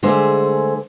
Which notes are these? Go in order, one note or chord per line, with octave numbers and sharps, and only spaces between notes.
D3 G#3 A3 G#4 C5